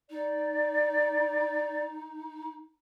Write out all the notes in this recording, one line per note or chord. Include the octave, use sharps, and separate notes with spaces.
D#4 D5